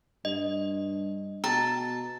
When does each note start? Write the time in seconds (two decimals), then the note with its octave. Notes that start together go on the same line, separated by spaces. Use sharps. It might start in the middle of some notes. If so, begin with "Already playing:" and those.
0.25 G2 D#5
1.44 B2 A5 A#5